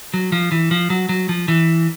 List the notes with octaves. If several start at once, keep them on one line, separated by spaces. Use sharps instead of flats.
F#3
F3
E3
F3
F#3
F#3
F3
E3